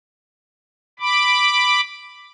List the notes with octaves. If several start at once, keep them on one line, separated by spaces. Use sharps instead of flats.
B5 D6